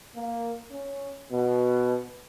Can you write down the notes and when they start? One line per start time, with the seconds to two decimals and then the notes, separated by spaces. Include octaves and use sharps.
0.16 A#3
0.71 C#4
1.31 B2